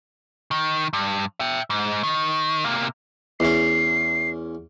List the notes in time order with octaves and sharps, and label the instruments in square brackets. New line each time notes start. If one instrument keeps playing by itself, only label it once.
[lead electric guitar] D#3
G2
E5 G5
G#2
D#3
C3 A#3
[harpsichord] E2 C#4 [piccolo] C7